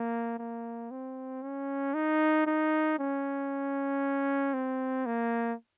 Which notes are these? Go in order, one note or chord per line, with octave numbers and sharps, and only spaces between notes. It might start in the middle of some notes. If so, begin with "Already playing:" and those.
Already playing: A#3
A#3
C4
C#4
D#4
D#4
C#4
C4
A#3